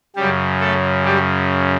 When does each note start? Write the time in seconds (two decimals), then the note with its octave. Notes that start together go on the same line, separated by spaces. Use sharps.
0.16 F#2 C#3 G3 G4
0.60 A3 A4
1.05 G3 G4